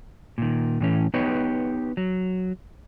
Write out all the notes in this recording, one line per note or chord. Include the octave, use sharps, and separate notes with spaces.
A#2 D#3
A2 E3 C#4
B3 D#4 G4 B4 C#5
F#3